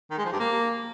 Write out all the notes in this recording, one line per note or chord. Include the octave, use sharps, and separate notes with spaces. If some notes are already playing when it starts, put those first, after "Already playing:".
D#3
G#3
F3
G2
A#3